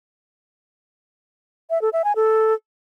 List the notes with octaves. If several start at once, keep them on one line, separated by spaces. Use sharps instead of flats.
E5
A4
E5
G#5
A4